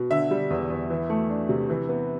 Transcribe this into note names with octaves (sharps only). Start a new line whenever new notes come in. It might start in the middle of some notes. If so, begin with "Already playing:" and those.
Already playing: B2
D3 E5
G3
E2
E2
E3
A3
D4
C3
E3
B3